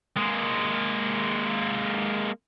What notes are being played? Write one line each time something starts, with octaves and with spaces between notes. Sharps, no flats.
G#3 A#3